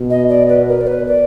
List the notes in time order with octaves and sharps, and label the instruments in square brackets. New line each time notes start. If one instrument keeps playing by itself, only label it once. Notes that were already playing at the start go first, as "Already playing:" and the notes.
Already playing: [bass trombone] B2
[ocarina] D#5
D5
B4
A#4
D5
B4
D5